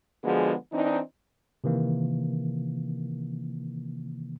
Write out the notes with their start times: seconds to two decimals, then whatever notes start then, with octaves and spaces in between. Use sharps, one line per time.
0.24 D3 F3 G#3 B3 F#4 G#4
0.73 E3 C4 D4 D#4
1.64 C3 D#3 E3 A#3